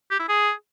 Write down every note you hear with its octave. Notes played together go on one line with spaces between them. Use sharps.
G4
E4
G#4